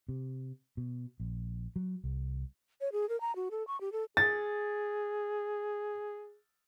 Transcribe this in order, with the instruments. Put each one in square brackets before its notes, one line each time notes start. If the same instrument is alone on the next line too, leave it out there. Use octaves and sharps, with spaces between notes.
[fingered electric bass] C3
B2
A#1
F#3
C2
[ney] C#5
G#4
A#4
A#5
F#4
A4
C#6
G4
A4
[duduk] G#4 [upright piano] A6